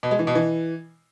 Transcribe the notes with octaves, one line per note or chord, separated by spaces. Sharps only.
B2
G#3
E3
B2
E3